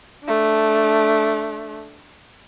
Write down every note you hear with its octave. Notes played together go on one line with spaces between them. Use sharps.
A3 D4